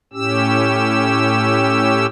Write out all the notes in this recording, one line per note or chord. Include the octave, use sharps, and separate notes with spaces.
A2 C#4 G4 E6